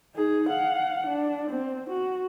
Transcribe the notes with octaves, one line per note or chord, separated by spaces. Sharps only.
D#4 G#4
F5 F#5
D4
C4
F#4